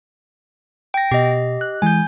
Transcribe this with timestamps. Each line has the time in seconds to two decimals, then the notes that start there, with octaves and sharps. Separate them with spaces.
0.94 G5 A#6
1.11 B2 G4 D#5
1.61 F#6
1.82 E3 G#3 G#5 G6